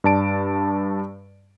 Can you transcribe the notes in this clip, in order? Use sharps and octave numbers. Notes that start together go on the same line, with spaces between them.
G2 D5 A5 D7